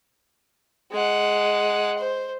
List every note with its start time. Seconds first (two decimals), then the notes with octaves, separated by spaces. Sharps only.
0.92 G#3 F#5
1.98 C5